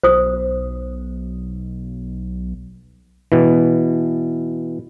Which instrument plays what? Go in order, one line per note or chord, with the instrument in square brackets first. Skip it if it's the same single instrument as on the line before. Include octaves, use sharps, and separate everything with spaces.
[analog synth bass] B1 [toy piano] C5 D#6
[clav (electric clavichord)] B2 E3